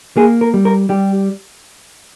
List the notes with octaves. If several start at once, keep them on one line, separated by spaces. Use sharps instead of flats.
A#3 G#4
A#4
G3
A#4
G3 G4